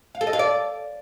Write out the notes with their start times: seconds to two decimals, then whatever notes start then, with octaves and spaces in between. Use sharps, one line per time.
0.15 F5
0.21 A4
0.27 D#5
0.33 F5
0.39 D5